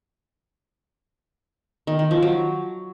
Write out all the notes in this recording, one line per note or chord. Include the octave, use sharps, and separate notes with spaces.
D#3
D#3
F3
F#3